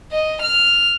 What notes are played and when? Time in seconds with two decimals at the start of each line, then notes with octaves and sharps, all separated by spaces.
0.12 D#5
0.42 F6